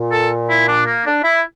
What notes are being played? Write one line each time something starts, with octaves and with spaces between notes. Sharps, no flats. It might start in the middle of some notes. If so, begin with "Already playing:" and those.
Already playing: A#2
A4
E4
D4
A#3
D4
E4